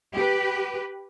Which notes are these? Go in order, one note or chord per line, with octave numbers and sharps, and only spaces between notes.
G4 B4